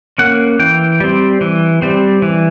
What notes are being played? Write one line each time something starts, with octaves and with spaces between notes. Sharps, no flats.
A#3 C#4 F#5
E3 G5
G3 C4
E3
G3 C4
E3